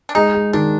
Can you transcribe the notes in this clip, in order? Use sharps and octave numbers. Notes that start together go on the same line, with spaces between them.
D4
G#3 D#4
G#3
D#3 D4